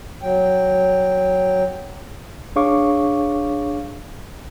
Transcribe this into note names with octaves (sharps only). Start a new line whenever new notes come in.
F#3 G5
D4 G#4 C#5 F5 C#6 D6